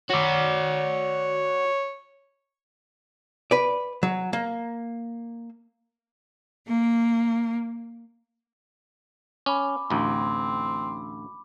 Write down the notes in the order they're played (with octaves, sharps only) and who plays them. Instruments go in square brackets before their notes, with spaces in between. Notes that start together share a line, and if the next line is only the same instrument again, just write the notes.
[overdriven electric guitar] F#4 D5 [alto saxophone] C#5
[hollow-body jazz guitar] B4 D5
F#3
A#3
[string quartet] A#3
[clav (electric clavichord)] C#4 [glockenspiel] B5 D6
[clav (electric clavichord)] A1 D2 [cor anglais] C4